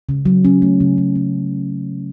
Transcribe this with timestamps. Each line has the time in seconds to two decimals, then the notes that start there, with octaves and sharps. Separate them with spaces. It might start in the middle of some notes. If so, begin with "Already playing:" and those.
0.09 C#3
0.25 F#3
0.45 C#4
0.62 A3
0.80 C#3
0.98 F#3
1.15 C#4